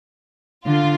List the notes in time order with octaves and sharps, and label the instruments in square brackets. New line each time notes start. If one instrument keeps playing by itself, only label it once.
[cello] D3 [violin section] F4